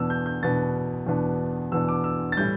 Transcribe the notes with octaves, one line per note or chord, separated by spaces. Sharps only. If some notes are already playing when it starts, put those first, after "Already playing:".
Already playing: E2 B2 B3 D4 E6
G6
G6
E2 B2 B3 D4 A6
E2 B2 B3 D4
E2 B2 B3 D4 E6
D6
E6
A6
A2 E3 G3 G6